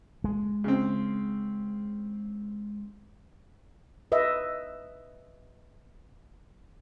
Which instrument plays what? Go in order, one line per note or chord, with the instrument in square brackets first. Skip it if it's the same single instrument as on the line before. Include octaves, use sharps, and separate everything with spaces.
[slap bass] G#3
[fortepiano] C#3 C4
[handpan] B4 D#5 E5